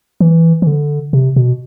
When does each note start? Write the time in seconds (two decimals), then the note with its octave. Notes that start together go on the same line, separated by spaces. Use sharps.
0.20 E3
0.62 E3
0.67 D3
1.13 C3
1.36 B2